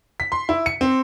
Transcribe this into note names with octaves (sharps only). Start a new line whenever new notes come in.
B6
C6
E4
C#7
C4